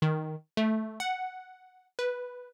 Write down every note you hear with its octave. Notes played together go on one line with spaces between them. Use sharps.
D#3
A3
F#5
B4